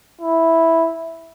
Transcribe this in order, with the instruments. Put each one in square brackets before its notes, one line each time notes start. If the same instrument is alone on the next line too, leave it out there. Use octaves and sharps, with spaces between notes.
[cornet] E4